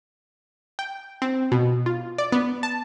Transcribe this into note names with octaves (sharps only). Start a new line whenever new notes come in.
G5
C4
B2
F4
D5
B3
A5